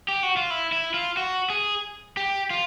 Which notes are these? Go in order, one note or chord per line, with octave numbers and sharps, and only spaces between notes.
G4
F#4
F4
E4
E4
F4
F#4
G#4
G4
F4